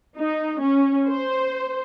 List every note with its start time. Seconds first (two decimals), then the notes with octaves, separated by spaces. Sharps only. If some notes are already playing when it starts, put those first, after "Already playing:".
0.17 D#4
0.61 C#4
1.08 C5